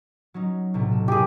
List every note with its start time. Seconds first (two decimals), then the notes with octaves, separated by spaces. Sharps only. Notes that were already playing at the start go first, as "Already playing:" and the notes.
0.34 F#3 C#4 D#4
0.74 B1 A2 C3
0.92 A4
1.08 F#2 A#3 G4 G#4